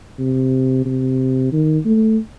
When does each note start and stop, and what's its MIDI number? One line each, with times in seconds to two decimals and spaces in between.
0.19 0.81 48
0.85 1.51 48
1.53 1.79 51
1.85 2.18 57